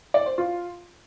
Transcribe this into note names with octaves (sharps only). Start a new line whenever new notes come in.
D5
C5
F4